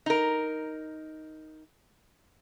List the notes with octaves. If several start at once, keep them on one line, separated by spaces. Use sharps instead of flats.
D#4 A#4